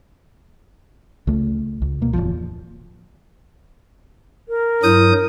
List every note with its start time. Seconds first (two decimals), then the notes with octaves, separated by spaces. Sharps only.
1.27 C#2 A3
1.82 C#2
2.01 B2 A#3
2.13 D1 G1 E2 F3
4.49 A#4
4.83 G2 F#3 E4 D#6 G6